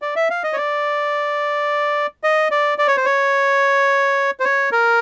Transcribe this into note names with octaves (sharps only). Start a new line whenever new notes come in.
D5
E5
F5
D#5
C#5
D5
D#5
D5
D5
C#5
C5
C#5
C5
C#5
A#4